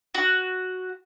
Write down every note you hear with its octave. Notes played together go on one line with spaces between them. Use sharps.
F#4